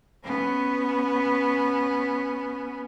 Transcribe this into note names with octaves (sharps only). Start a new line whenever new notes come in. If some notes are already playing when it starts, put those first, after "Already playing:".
B3 C#4